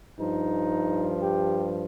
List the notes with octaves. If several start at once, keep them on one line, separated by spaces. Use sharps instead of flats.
G2 F3 D#4
G4